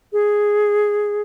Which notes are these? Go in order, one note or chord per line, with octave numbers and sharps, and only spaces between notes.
G#4